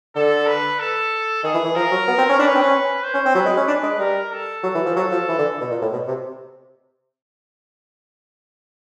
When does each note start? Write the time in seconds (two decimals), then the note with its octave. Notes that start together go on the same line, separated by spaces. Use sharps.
0.15 D3 A4
0.47 B4
0.80 A4
1.44 D#3 G#4
1.54 E3
1.64 E3
1.75 F3 A#4
1.91 F#3
2.08 B3
2.18 C4
2.29 C#4
2.39 D4 B4
2.47 C#4
2.55 C4
2.62 C#4
3.03 C5
3.14 C#4
3.25 C4
3.35 F#3 B4
3.46 G#3
3.57 C#4
3.68 D4
3.83 G#3
3.99 G3 A#4
4.32 A4
4.63 F#3
4.75 E3
4.86 F3
4.96 F#3 A4
5.11 F3
5.29 E3
5.38 D3
5.61 B2
5.71 A#2
5.82 A2
5.92 B2
6.07 C3